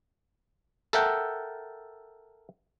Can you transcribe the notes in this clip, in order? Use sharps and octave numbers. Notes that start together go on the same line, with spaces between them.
A4 A#4 E5 F#5 G5 A5